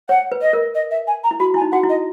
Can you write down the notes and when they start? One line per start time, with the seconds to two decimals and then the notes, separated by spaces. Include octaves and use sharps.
0.09 C#5 F#5
0.32 B4
0.42 D#5
0.53 A#4
0.75 D#5
0.91 E5
1.07 G#5
1.24 A#5
1.31 E4
1.40 F#4 B5
1.54 E4 G#5
1.62 D#4
1.72 F#4 F#5
1.83 E4
1.89 D#5